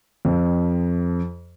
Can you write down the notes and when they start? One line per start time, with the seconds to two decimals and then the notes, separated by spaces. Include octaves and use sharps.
0.25 F2